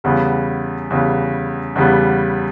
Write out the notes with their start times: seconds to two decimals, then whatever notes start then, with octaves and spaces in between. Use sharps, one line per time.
0.04 E2 C#3 G3 B3
0.90 E2 C#3 G3 B3
1.76 E2 C#3 G3 B3